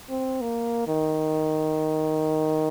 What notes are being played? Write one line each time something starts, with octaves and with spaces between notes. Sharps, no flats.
C4
A#3
D#3